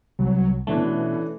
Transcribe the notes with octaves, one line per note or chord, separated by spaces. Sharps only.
C2 F#3
B2 E3 A3 C#4 D4